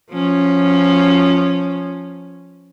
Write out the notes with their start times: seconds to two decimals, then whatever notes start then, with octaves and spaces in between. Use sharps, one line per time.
0.11 F3 C#4